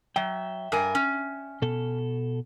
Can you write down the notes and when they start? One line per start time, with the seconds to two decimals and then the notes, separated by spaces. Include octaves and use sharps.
0.16 F#3 E5 G5
0.72 G2 A#4 G#5
0.95 C#4
1.62 B2 A4